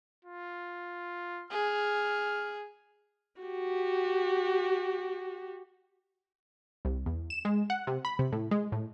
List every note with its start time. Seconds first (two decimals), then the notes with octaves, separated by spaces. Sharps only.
0.25 F4
1.51 G#4 F6
3.41 F#4 G4
6.85 C2
7.06 E2
7.30 E7
7.45 G#3
7.70 F#5
7.87 C3
8.05 B5
8.19 C3
8.32 A2
8.51 G#3
8.72 A2